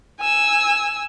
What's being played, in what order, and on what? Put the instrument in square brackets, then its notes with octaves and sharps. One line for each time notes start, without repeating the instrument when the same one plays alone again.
[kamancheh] G#5 E6